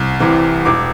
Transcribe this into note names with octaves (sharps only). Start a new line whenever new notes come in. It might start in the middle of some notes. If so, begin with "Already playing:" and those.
Already playing: C2
C3 E3
E1 D6